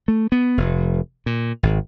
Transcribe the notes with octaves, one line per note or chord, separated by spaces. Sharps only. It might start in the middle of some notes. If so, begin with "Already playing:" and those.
A3
B3
F1
A#2
G#1